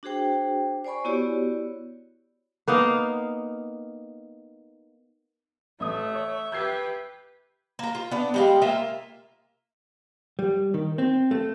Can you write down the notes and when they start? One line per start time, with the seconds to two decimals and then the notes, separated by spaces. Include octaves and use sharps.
0.03 D4 F#4 G#4 C5 G5
0.85 C5 D5 G#5 B5 C#6
1.05 B3 E4 F#4 G4 C#5 D5
2.68 A#3 B3 D#4 F5
5.80 A1 A3 E5 D#6
6.15 C#5
6.52 G4 B4 G6 G#6 C7
7.79 A#3 A#5
7.95 F4
8.11 B3 D4
8.34 G3 G#3 F5
8.62 A#3 F4 E5 F5
10.39 G3
10.74 D#3
10.98 C4
11.31 A3